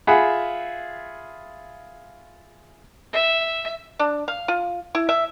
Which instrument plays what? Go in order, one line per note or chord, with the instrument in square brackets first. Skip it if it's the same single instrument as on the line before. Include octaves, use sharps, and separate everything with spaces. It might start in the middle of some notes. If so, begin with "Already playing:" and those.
[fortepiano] F4 G#4 E5 F#5 B5
[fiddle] E5
[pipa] D4
F5
F4
E4
E5